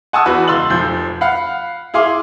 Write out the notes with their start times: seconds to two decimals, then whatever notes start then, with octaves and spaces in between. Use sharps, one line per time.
0.13 F#5 G#5 A5 C#6 D#6 E6
0.26 E2 F#4 B4 B5
0.48 C#2 C6 E6 A6 F#7
0.70 F1 F3 G6
1.21 F5 F#5 B5
1.94 E4 G#4 F5 C6 D6